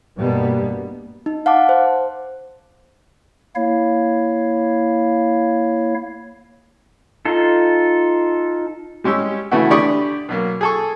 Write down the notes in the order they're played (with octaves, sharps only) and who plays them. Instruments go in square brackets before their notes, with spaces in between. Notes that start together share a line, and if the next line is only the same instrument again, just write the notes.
[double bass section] G2 B2 G3 A#3 B3
[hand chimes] D#4
F5 F#5 A5 D6
C5
[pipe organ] A#3 E4 C#5 F5
[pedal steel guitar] D#4 F4 A4
[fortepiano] G3 G#3 C#4 G4 E6
C#3 E3 A3 B3 E4 F#4
D3 G4 D5 B5 C#6 D#6
B2 F#3 A#3
G#4 A4 C#6